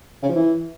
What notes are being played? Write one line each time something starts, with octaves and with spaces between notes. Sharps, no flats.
C#3
F3
E3